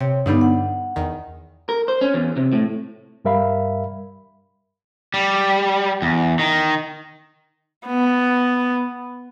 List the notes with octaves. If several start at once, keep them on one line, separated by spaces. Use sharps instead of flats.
C3 C#5
G2 D3 G3 B3 D4 D#4
F#5
E2 D#3
A#4
C5
C#4
E2
C3
A2
G2 G3 A#4 E5 F5 B5
G3
E2
D#3
B3